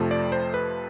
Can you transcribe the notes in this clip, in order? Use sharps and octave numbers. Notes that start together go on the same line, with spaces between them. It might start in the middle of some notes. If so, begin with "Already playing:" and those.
Already playing: F2 C3 F3 A3
D5
C5
B4